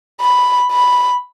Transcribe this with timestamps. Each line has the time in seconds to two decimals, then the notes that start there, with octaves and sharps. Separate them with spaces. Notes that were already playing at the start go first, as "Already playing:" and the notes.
0.21 B5
0.72 B5